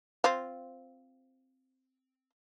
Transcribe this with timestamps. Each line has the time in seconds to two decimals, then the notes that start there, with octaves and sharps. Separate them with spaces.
0.24 C4 F4